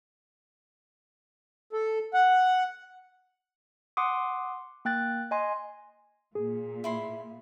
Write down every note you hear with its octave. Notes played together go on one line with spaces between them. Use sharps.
A4
F#5
F#5 C6 D6 D#6
A#3 G5 F#6 A6
D#5 G#5 C6
A#2 G#4
E4 B5 C6